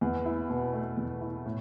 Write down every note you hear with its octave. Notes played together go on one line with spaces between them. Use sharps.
E2
E4
B2
A3
E2
E4
A2